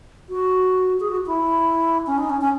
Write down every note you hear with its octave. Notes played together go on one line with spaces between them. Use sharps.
F#4
G#4
F#4
E4
C#4
D#4
C#4
C#4